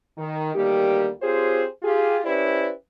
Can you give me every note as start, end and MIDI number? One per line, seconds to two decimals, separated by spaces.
0.18 0.52 51
0.54 1.08 38
0.54 1.08 51
0.54 1.08 55
0.54 1.08 58
0.54 1.08 67
1.22 1.65 60
1.22 1.65 65
1.22 1.65 67
1.22 1.65 68
1.22 1.65 72
1.22 1.65 73
1.83 2.19 65
1.83 2.19 67
1.83 2.19 68
2.25 2.70 61
2.25 2.70 64
2.25 2.70 67
2.25 2.70 71
2.25 2.70 72
2.25 2.70 74